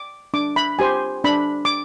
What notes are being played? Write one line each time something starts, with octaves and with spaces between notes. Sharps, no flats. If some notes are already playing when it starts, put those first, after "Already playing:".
Already playing: D6
D4 D6
B5
G4 C5 G#5
D4 B5
D6